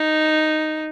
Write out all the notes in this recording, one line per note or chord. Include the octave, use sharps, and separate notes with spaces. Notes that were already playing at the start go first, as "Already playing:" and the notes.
Already playing: D#4